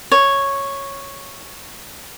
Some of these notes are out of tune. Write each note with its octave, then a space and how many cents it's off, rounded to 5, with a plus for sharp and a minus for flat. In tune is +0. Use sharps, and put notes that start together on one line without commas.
C#5 -5